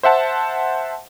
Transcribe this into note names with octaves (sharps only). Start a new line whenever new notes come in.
C5 E5 F#5 A5